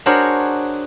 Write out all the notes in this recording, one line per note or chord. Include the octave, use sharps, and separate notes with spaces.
D4 F#4 G#4 A#4 C5 C#5